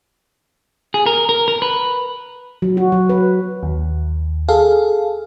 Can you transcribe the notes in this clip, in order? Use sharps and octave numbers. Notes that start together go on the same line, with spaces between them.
G#4
A#4
A#4
A#4
B4
F#3
F#4
F#3
B4
D#2
G#4 A4 F5